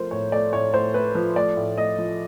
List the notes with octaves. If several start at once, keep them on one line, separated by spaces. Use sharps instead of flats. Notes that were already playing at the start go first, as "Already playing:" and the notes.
Already playing: F3 A3 A#4 C5
A2 C#5
A3 D5
A2 C#5
A2 C5
A3 B4
F3 B4
A3 D5
A2
A3 D#5
F3